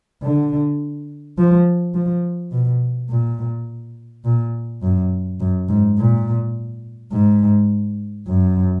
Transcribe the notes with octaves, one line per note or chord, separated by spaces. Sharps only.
D3
F3
F3
B2
A#2
A#2
F#2
F#2
G#2
A#2
G#2
F#2